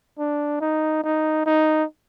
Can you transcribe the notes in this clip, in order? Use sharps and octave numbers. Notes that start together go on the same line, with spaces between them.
D4
D#4
D#4
D#4